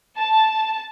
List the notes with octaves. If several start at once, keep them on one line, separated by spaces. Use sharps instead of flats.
A5